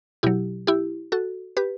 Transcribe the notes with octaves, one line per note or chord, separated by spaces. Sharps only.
B2 F#3 E4 G4
E4 G4
F#4 A4
G4 B4